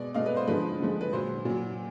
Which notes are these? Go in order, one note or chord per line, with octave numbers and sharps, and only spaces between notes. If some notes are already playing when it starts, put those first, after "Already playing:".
Already playing: B2 G#3 D5
B2 G#3 D#5 F5
B4
C5
D3 F3 G#3 B4
D3 F3 G#3
B4
A#2 F#3 C5
A#2 F#3